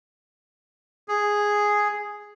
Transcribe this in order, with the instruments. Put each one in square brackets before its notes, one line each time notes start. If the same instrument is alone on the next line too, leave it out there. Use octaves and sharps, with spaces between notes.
[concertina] G#4